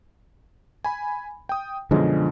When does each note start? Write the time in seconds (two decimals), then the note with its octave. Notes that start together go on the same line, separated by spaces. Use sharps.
0.84 G#5 B5
1.49 G5 D#6
1.91 F#2 B2 D3 F3 G#3